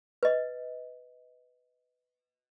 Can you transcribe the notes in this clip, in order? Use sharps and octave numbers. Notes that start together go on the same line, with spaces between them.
B4 D#5